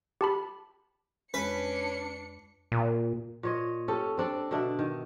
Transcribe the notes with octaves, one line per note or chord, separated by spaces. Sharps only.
G4 A5 B5
F2 G#3 C#4 D4 B4 G#5 C#7
A#2
A#2 C#5 D#5
C#4 G4 A4
C4 D4 A4
B2 D3 D4 E5
D#3